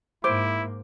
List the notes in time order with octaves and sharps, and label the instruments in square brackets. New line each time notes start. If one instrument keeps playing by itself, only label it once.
[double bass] G#2 A#3 [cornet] E4 [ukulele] C5 [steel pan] D6